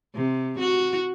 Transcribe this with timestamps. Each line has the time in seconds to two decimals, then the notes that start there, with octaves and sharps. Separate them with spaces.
0.15 C3
0.60 F#4